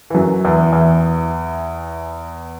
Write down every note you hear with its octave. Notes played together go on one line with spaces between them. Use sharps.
E3
F#2 F#3
E2 E3
E2 E3